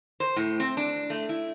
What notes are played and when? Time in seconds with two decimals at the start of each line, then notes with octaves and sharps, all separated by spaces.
0.20 C5
0.36 A2
0.60 C4
0.77 D4
1.10 A3
1.29 E4